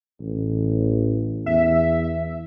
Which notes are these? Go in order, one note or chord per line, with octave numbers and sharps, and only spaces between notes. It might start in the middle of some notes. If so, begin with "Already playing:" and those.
A1
E2 E5